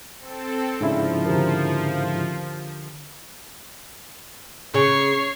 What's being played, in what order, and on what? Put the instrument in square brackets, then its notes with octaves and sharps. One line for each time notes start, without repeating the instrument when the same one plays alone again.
[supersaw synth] C4 A4
[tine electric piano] G#2 C#3 E4 [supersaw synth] F3 [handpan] D4
[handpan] D3 G4 A#4
[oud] C#3 [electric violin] C#5 C7